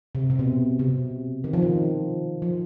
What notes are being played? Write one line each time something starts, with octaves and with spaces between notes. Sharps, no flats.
C3
C3
B2
C3
D#3
F3
D#3
F3